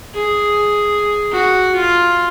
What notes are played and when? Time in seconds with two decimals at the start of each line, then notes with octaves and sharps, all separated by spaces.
0.15 G#4
1.32 F#4
1.76 F4